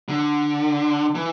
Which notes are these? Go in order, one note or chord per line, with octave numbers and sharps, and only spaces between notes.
D3
E3